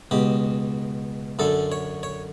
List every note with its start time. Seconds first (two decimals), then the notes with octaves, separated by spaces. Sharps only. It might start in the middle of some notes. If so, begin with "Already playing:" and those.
0.11 C#2 B2 G4
1.39 F#2 D3 A4
1.72 C#5
2.03 C#5